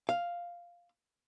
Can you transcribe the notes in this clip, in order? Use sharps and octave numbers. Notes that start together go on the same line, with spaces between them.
F5